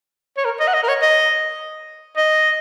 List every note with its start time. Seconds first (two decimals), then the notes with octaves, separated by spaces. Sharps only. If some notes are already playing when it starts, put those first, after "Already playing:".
0.37 C#5
0.45 A#4
0.60 D#5
0.67 F#5
0.74 D#5
0.83 A#4
0.88 C#5
1.02 D#5
2.17 D#5